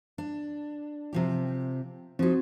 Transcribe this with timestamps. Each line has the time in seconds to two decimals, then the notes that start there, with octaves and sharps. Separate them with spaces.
0.18 D4
1.13 C3 F3 G4
2.19 F3 C4 D#4 F#4